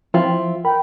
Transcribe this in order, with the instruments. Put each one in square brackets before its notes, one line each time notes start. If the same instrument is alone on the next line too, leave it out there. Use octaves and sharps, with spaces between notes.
[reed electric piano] F3 [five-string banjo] C4 E4 F4
[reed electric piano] A#4 B5 [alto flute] G5